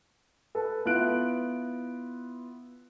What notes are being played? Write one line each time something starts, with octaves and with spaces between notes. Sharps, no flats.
A4 B4
B3 E4 F4 F#6 D7